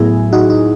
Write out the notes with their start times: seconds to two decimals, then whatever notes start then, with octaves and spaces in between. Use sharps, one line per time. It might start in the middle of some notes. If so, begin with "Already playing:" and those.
Already playing: A2 F#3 B3 E4 G#4
0.33 D#4 F#4
0.50 D#4